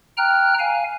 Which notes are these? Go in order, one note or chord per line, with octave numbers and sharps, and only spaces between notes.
G5 A#5 F6 F#6
F5 G#5